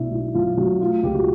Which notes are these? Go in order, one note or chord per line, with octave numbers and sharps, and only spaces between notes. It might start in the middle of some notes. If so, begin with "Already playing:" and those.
Already playing: B1 B2 D4 E4
B1
F#3 F4
F#3 F#4
A3 F4
C#2 G4
F#4